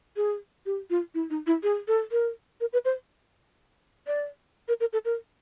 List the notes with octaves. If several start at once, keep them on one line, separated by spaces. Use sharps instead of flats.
G#4
G4
F4
E4
D#4
E4
G#4
A4
A#4
A#4
B4
C5
D5
A#4
A#4
A4
A#4